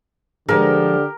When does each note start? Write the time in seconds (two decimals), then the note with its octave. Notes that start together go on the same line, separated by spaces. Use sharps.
0.49 D3 F3 G#3 G4 A#4